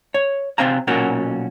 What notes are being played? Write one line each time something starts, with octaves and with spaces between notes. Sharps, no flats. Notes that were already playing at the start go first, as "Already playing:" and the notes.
C#5
C3 G#3 C4 C5 F5 A#5
B1 A#2 A#3 C#4 F#4 A#4